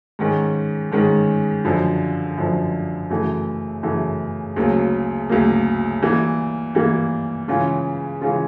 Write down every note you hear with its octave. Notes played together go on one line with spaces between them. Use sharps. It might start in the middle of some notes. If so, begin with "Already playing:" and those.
G#2 D#3 G#3 C#4
G#2 D#3 G#3 C#4
F#2 D3 F3
F#2 D3 F3
F#2 C#3 E3 A3
F#2 C#3 E3 A3
D2 C#3 F#3 A#3
D2 C#3 F#3 A#3
E3 G3 A#3
E3 G3 A#3
C#3 E3 G#3 C#4 F4
C#3 E3 G#3 C#4 F4